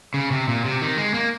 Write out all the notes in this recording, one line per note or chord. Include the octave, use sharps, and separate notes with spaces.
C#3
C3
A#2
C3
D#3
G#3
A#3